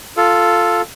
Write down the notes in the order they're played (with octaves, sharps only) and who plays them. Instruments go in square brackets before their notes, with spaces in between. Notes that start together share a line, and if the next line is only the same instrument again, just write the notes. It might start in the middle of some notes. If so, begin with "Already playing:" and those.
[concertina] F4 A4